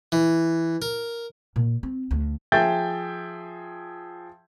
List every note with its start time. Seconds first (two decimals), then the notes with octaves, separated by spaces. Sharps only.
0.12 E3
0.82 A#4
1.56 A#2
1.83 C4
2.11 D2
2.52 F3 G#4 E5 G5 G6 A6